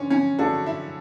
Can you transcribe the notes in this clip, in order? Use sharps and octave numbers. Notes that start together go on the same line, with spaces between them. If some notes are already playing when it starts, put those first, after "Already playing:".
Already playing: D3 C#4 D4
C#4
D3 A3 D4 F#4 A4
E4